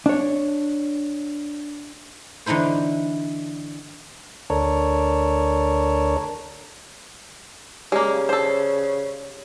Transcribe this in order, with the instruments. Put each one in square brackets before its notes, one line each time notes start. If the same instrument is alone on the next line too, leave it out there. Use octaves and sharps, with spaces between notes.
[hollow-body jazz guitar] D4 C#5
[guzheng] D3 E3 D#4 E4 C5
[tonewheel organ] D2 D4 A4 A#4 C#5
[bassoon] C#3 [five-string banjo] G#3 A#3 [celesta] G4 D5
[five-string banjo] A4 C5